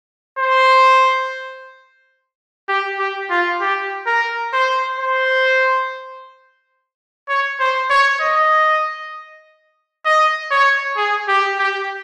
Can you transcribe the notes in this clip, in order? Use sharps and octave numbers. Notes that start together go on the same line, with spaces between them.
C5
G4
G4
F4
G4
A#4
C5
C5
C#5
C5
C#5
D#5
D#5
C#5
G#4
G4
G4